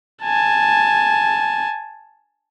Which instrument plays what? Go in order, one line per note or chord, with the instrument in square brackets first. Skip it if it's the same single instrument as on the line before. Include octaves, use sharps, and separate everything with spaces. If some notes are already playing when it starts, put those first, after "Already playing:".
[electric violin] G#5 A5